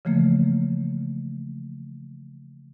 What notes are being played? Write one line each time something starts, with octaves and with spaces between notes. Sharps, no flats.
C#3 E3 F3 A3 A#3